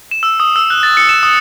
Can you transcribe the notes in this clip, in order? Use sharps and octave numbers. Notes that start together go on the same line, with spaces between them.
E7
E6
D#6
E6
F#6
A6
C#7
E7
D#6